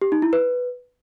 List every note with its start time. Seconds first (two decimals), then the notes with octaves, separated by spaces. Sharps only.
0.01 G4
0.12 D#4
0.22 E4
0.33 B4